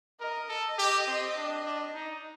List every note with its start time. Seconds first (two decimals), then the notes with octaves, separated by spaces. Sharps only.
0.20 A#4 D#5
0.49 A4
0.79 G4
1.07 C4
1.37 D4
1.65 D4
1.95 D#4